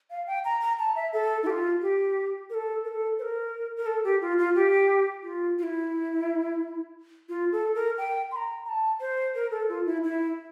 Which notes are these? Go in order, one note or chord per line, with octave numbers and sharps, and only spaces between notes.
F5
G5
A#5
A#5
A5
E5
A4
E4
G4
F4
G4
A#4
A4
A#4
A4
C5
A#4
A#4
A4
G4
F4
F4
G4
F4
F4
E4
F4
A4
A#4
G5
C6
A#5
A#5
A5
C5
A#4
A4
F4
E4
E4